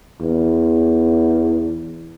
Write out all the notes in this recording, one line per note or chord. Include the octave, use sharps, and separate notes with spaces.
E2